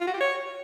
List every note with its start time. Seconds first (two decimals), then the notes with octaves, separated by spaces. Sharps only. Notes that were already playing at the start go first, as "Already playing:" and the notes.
0.01 F4
0.07 F#4
0.14 G4
0.21 C#5